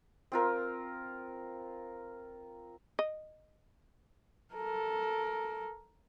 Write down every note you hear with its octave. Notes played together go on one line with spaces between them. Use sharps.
C4 F4 A#4
D#5
A4 A#4